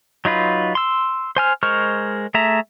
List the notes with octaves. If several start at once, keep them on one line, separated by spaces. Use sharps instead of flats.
F#3 D#4 F4 B4
C6 E6
C5 G#5 F6
G#3 A#4 C5 C#6 F6
A3 G#4 E5 A#5